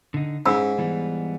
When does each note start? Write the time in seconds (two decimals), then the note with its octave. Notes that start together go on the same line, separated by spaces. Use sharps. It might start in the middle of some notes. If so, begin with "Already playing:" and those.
0.14 D3 D#4
0.46 G#2 C#4 D#4 E4 B5 E6
0.78 E3 G3 B3